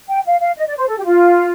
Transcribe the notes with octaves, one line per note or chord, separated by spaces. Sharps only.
G5
F5
F5
D#5
D5
C5
A4
G4
F4